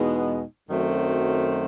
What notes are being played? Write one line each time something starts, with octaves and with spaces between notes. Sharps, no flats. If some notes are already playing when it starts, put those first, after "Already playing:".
Already playing: E2 B2 G#3 B3 D#4
F#2 D#3 F#3 A3 C4